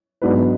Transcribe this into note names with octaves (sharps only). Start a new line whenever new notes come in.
G#2 F#3 B3 D4 B4